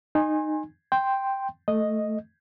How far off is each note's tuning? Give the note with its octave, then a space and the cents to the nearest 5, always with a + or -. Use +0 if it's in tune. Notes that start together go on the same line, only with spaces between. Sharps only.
D#4 -15 G#5 -20 C6 +35
G5 +0 C6 +0
A3 +0 D#5 +0